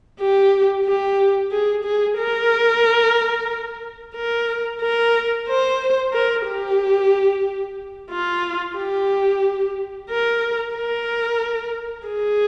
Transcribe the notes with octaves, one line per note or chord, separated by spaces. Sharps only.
G4
G4
G#4
G#4
A#4
A#4
A#4
C5
A#4
G4
F4
G4
A#4
A#4
G#4